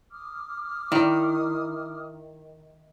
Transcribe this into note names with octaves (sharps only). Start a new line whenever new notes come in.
D6 D#6 F6
D#3 E4 D5